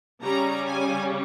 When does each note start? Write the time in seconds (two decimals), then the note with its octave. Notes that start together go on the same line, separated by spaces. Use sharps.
0.22 C#3 G3 C#4 A#5
0.67 G#5